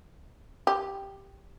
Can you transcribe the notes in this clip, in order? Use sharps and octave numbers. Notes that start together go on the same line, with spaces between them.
G4